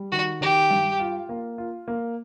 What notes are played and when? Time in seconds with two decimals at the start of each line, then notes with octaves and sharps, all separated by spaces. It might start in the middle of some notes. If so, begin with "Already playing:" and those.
Already playing: G3
0.12 D#3 F#4
0.41 D#3 G4
0.71 G2
1.00 F4
1.29 A#3
1.58 F4
1.88 A#3